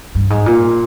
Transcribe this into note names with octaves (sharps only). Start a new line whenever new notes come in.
G2
G#2
A#2